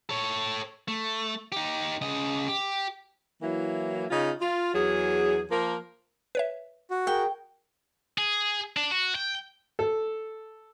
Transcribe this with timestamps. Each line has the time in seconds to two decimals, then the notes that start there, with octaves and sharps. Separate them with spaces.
0.09 A4 C#5
0.88 A3
1.52 D#4 G4
2.01 C#3 D#5
2.48 G4
3.42 E3 F#3 A#3 E4
4.10 C#3 D#4 F4
4.41 F4
4.74 E2 F#3 G#4
5.51 F3 A#3 A#4
6.35 B4 C#5 E5
6.91 F#4
7.07 G#4 A#4 G5
8.18 G#4
8.77 D4
8.91 F#4
9.15 G5
9.79 A4